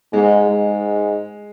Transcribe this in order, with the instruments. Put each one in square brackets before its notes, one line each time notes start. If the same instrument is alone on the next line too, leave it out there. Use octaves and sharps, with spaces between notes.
[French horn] G#2 [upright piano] G#3
[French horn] G#2